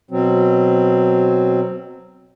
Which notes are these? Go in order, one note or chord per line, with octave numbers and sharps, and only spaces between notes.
B2 F#3 C4